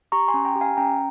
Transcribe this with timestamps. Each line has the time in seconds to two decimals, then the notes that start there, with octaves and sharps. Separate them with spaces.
0.12 G4 A#5 C#6
0.28 G#5 C6
0.34 C#4
0.45 G5 A#5
0.56 G4
0.61 F5 G#5
0.77 C#4 G5 A#5